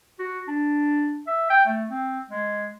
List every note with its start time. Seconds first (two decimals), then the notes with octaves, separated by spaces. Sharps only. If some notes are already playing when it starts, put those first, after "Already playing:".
0.19 F#4
0.48 D4
1.27 E5
1.50 G5
1.66 A3
1.90 C4
2.30 G#3